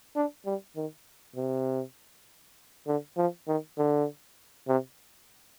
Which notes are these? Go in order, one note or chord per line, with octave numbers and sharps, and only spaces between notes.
D4
G3
D#3
C3
D3
F3
D#3
D3
C3